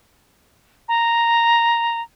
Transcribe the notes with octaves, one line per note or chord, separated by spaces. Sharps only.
A#5